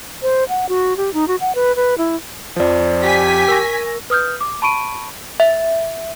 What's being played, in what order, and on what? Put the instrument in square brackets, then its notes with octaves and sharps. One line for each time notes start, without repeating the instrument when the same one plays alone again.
[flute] C5
F#5
F#4
G4
D#4
F#4
F#5
B4
B4
E4
[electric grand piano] F2 F3 [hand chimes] C5 D5
[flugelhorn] G4 [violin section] G#5 B6
[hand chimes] A#4 C#6 [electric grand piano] E6 A#6
[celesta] B4 D#6 F6 G6
D6
A5 B5 C#6 D7 D#7
[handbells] E5